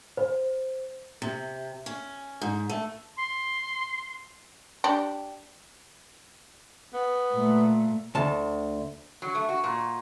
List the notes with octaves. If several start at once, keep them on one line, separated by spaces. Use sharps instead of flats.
C5
C3
C#4
G#2
A3
C6
D4 G4
B3
A#2 A3
D2 A5
F#3
A3
F#4
A#2